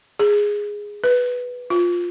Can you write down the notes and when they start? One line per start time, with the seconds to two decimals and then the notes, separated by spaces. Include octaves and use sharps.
0.19 G#4
1.04 B4
1.70 F4